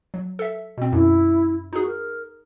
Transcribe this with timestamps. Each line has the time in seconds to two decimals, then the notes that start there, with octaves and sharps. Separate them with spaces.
0.14 F#3
0.39 A4 E5
0.78 B2 C4
0.92 F#2 E4
1.73 D#4 F#4 G#4
1.87 A#4